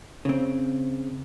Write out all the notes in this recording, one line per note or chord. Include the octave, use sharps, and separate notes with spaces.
C#3 C4